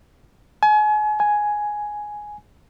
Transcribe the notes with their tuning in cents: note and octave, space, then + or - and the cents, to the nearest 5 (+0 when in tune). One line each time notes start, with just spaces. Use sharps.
G#5 +35
G#5 +5